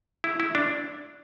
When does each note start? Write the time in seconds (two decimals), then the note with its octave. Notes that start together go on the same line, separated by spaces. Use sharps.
0.24 E4
0.40 E4
0.55 D4